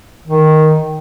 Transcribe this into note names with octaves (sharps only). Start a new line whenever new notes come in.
D#3